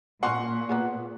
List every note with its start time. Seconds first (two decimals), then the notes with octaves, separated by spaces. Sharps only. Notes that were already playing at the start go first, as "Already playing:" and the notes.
0.23 A#2 A#3 B3 C#4 F#5 C6 C#6
0.69 A#3 B3 G#4